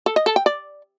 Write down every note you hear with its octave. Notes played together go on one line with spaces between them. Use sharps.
A4
D#5
A4
G5
D5